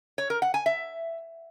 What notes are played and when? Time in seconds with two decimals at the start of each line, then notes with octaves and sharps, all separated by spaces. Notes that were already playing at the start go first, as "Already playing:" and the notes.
0.18 C#5
0.30 A#4
0.42 F#5
0.54 G#5
0.66 E5